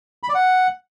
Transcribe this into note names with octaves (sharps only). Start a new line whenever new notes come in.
B5
D5
F#5